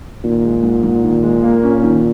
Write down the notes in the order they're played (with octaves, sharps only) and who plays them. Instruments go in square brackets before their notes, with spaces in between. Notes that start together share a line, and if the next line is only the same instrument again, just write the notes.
[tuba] A#2 [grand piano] D#3
[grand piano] G#3
G#2
G#2
D#3
G#3
A#3
C#4
D#3